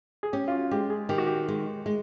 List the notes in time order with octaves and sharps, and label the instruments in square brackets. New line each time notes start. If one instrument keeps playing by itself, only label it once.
[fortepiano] G#4
[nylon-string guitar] C#4 [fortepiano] G4
[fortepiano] F4
F#4
[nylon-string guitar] G#3 [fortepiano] G4
[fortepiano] G#4
[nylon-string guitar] D#3 [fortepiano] G4
[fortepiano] F#4
G4
[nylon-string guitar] G#3
G#3